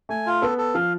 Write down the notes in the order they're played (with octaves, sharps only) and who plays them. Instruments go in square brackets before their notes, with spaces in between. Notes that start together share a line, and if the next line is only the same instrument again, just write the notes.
[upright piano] A3 [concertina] G#5
[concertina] F4
[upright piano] B3 [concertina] A4
[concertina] A4
[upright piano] F3 [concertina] F5